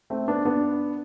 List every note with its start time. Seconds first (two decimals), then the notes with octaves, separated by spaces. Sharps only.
0.10 A3 C4
0.28 B3 D4
0.45 B3 D4